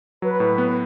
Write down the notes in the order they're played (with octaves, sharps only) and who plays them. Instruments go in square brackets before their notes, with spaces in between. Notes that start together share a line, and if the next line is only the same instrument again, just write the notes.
[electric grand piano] F#3 [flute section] B4
[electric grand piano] A2
B3